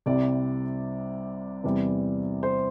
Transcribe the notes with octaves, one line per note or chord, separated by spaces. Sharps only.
C2 C3 G3 D5
E2 C3 G3
C5